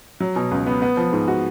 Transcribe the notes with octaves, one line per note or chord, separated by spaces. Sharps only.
F#3
B2
C#2
B3
B3
F3
G#2
F#4